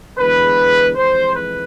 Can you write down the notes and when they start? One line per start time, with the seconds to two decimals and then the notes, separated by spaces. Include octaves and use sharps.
0.19 E2 D3 G#3 B4
0.96 F2 E3 G#3 C5
1.35 B4